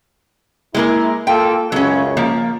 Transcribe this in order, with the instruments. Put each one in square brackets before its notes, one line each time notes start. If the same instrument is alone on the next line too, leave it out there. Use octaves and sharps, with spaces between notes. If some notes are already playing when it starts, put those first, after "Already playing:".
[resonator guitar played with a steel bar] G#3 A#3 A#4 [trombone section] E4
[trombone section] A#3 F4 A4 [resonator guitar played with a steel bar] G5
[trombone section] C#2 F#2 C#3 [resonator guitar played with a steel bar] F#3 C#4
[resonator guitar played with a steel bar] F3 A#3